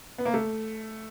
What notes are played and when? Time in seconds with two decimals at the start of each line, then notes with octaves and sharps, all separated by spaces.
0.18 B3
0.25 A#3
0.34 A3